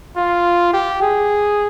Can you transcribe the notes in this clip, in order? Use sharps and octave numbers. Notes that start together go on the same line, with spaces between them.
F4
G4
G#4